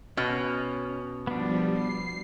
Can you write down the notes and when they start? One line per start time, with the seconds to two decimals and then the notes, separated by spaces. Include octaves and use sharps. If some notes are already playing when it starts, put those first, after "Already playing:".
0.17 B2 C#4 F6
1.27 F3 G3 B3 D4
1.72 C7